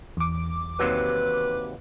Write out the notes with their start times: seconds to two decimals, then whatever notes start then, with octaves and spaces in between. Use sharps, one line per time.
0.17 E2 D6
0.79 D#2 C3 F#3 B4